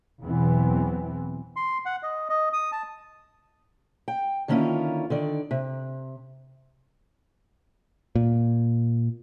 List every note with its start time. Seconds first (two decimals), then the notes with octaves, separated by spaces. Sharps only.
0.22 E2 B2 E3 F#3 B3 C4
1.56 C6
1.85 F#5
2.03 D#5
2.29 D#5
2.53 D#6
2.72 A5
4.08 G5
4.48 D3 D#3 A#3 C#4 E4 F4
5.10 D3 D#3 D5
5.51 C3
8.16 A#2